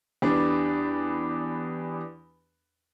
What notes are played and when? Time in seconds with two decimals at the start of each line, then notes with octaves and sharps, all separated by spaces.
0.22 E2 G3 D4 B4